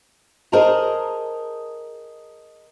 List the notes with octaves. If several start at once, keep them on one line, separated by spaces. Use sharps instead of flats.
G#4 A#4 C5 D#5 A5 A#5